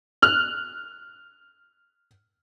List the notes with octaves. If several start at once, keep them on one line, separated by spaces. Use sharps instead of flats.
F6 F#6